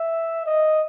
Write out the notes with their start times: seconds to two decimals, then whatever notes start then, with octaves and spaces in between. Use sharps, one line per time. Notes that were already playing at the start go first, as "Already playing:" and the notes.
Already playing: E5
0.46 D#5